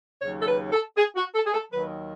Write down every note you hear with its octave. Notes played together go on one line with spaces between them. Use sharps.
D#2 C#3 F#3 C#5
A4
B4
A4
G#4
F#4
A4
G#4
A4
D#2 D#3 F#3 B4